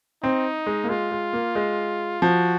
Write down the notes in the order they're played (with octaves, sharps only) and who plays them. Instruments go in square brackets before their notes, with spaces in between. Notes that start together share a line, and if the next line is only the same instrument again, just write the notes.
[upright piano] C4 [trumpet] D#4
[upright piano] G#3
A#3
[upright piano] G#3 [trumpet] F4
[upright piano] G#3
A#3
G#3
[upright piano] F3 [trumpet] F#4